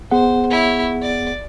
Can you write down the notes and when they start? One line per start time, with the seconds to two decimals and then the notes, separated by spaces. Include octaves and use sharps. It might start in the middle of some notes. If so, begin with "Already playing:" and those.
0.11 B3 G#4 C5 F#5
0.50 E4 C#5
1.02 D5